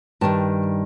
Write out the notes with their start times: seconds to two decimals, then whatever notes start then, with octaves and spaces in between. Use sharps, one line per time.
0.21 G2 D#3 G3 A5